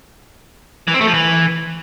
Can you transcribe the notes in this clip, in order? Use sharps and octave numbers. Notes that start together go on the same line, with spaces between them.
E3
C4
A3
F3
E3